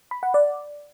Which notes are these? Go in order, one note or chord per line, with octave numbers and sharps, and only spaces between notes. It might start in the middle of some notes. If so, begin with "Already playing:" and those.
B5
F#5
D5